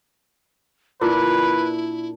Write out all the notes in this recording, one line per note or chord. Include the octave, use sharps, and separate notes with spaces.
A#2 D4 E4 B4